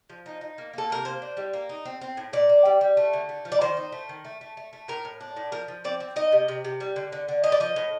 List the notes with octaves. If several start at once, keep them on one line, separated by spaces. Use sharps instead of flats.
F3
D#4
D#4
A#3
A#3 A4
C3 A#4
A#3 C5
D4
G3
A#3
D#4
C4
C4
A2
A#2 D5
A#3
G3
G3
A3
D3
A3
F3
D5
D#3 C5
D#4
A3
D#3
A3
A3
A3
A3
A2 A#4
A2
D4
A2
F3 A#4
F3
C4 D5
C4
D#4 D#5
C3
C3
C3
G3
D3
D3
D3
A2 D#5
D5
F3 D#5
A2